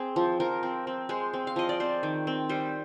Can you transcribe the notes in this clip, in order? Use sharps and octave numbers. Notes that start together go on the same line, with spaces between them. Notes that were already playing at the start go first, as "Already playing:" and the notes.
Already playing: C4 G#4
F3
F3 A#4
C4
C4
G#3 C5
C4
F5
F3 D#5
D5
C4 C5
D#3
C4
G3 C5